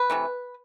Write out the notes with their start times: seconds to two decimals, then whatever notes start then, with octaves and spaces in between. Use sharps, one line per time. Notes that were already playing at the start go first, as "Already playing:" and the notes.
Already playing: B4
0.10 C3 E3 A3